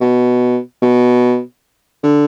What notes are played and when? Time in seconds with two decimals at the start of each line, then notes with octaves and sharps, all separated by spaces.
0.01 B2
0.82 B2
2.03 D3